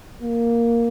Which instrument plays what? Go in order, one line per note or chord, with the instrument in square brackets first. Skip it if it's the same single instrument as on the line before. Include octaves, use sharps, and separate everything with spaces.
[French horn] A#3